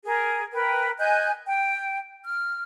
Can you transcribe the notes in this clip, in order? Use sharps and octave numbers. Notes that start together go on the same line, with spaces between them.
G#4 A#4
A#4 B4 G5
D#5 G#5 F#6 G6
G5
F6